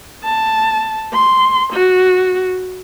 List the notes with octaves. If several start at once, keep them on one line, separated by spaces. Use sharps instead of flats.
A5
C6
F#4